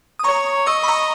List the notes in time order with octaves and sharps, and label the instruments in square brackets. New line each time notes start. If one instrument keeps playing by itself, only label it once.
[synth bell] D#6
[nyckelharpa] C#5 [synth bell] A#5 C#6
[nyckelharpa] D#5 [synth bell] C#6 E6
[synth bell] B5
A#5 C#6